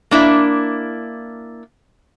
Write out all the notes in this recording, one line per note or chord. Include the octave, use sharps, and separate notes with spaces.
A#3 D4 E4